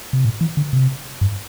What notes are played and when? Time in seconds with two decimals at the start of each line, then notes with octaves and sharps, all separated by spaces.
0.13 C3
0.25 A2
0.41 E3
0.57 D3
0.73 C3
1.21 G2